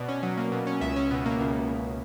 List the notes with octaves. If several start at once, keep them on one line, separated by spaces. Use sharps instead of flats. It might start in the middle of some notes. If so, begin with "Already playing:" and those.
Already playing: B2 D5
C#4
F#3
A#3
B2
C#4
C#2 E5
C#4
B2
A#3
C#2